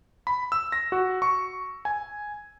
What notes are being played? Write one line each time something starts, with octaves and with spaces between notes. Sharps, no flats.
B5
E6
A#6
F#4
C#6
G#5